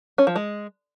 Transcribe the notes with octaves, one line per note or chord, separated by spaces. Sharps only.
C#4
F3
G#3